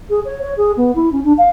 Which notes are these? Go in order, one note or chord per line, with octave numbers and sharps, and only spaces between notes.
G#4
C#5
C#5
G#4
B3
E4
C#4
D4
F5